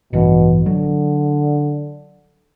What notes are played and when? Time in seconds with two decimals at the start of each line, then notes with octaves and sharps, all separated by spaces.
0.13 A1 G2 B2 E3
0.66 D3 F#3